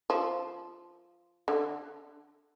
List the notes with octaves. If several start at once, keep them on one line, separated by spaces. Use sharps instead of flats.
F3
D3